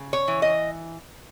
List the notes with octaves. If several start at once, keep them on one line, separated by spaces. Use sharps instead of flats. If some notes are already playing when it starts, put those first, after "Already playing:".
Already playing: C#3
C#5
E3
D#5